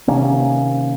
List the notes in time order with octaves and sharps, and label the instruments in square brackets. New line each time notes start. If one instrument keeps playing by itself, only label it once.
[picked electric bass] C3 D#3 A#3 C#4